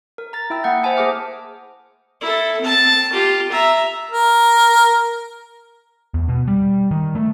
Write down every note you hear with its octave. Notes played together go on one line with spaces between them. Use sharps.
A#4
A#5 A6
E4 E5 G5 E6
A#3 F#5 G6
C5 E5 F#5 G#5 A5
A#3 G#4 C5 D6 F6
E4 A4
C4 A5
F4 G4
E5 A#5
A#4
E2
B2
G3
D#3
A3